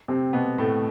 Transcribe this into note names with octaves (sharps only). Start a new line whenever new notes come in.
C3 C4
B2 B3
A2 A3